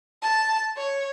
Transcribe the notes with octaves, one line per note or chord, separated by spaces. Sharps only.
A5
C#5